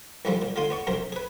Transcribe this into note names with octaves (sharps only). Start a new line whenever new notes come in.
C2 F2 D#3 F3 G3 G#3
A#2
D3 G#3 F4 G#5 C6
B3 D5 C#6
A#1 F#2 C3 A#4 C5 A#5
G#4 B4